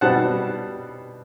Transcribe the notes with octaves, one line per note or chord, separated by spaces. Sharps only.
B2 G3 C4 F#5 A5